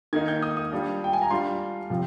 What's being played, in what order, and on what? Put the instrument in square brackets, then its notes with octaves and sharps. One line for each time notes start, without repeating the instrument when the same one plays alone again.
[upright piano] D#3 A#3 D#4 G#6
G6
D#6
D#6
G3 D4 F4
G5
G#5
A#5
G3 D4 F4 C6
C3 F3